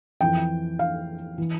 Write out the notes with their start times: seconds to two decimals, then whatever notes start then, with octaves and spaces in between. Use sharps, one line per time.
0.21 F2 E3 G5
0.79 F5
1.38 E3